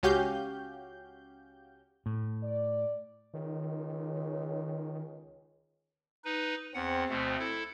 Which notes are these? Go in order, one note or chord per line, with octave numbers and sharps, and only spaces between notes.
C#2 C#4 F#4 G4 F5 G6
A2
D5
C#2 D#3
D#4 B4
E2 C4 F#5
D2 B2 A3
E4 A4